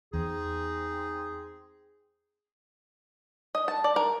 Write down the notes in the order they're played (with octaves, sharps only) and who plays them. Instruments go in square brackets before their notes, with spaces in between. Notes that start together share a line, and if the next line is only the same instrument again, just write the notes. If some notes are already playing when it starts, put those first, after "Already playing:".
[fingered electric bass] E2 [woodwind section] C4 D#4 G#4
[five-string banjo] D#5
A5
D5
A#4